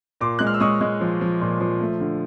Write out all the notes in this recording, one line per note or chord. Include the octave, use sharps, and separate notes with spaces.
A#2 C6 D6
G#3 F#6
F6
E6
G#3 C#6 D#6
G#3
F3
F3
A#2
F3
A3
D3